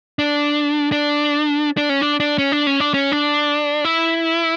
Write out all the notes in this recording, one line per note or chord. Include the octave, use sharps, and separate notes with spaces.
D4
D4
D4
C#4
D4
D4
C#4
D4
C#4
D4
C#4
D4
E4